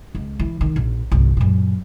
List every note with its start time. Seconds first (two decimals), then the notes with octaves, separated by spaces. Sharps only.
0.15 C#2
0.39 E3
0.61 D#3
0.76 A#1
1.12 G1 C2
1.37 F#2 A#2